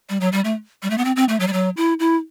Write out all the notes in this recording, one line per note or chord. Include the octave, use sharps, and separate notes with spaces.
G3
F#3
G3
A3
G3
A3
B3
C4
C4
A3
F#3
G3
F#3
E4
E4